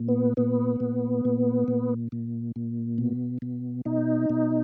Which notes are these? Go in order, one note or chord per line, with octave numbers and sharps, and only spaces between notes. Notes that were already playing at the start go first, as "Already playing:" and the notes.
Already playing: A#2
B3
A#2 B3
A#2
A#2
A#2
A#2
A#2
B2
B2
B2 D#4
B2